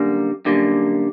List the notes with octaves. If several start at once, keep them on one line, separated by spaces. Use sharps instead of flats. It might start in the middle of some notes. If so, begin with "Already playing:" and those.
Already playing: F#2 D3 G3 A#3
F#2 D3 G3 A#3